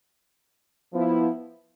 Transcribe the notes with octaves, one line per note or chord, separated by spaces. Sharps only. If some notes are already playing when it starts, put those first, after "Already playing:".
F3 B3 E4